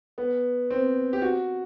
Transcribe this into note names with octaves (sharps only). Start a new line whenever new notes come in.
B3
C4
G4
F#4